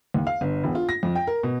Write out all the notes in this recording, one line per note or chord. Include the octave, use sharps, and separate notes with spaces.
D#2
F5
G1
E1
F4
A#6
F2
G5
A#4
B2